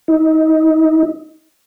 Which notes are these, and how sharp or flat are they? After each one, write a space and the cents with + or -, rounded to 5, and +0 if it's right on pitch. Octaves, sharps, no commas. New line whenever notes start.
D#4 +30